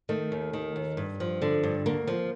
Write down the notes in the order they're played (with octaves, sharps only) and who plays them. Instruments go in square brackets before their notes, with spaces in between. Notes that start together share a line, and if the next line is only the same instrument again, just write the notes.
[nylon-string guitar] D#3 A3
D#2
D#3
D#2
G2
F3
D3
G2
D2 A#3
F3